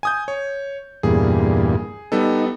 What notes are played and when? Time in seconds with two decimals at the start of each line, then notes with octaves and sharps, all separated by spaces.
0.03 G#5 D#6 G6
0.28 C#5
1.03 E2 G2 A#2 G#4
2.12 G3 B3 D#4 A4